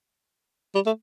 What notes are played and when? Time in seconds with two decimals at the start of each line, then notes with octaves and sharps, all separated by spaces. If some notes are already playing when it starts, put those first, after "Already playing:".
0.75 G3
0.86 A3